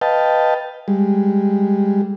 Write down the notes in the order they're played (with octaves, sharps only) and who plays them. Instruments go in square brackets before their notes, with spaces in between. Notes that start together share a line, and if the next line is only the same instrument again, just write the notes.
[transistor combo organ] B4 D#5 F5 G5 A5
G3 G#3